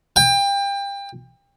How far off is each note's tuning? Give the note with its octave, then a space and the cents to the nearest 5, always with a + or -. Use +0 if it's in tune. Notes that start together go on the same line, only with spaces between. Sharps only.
G5 +30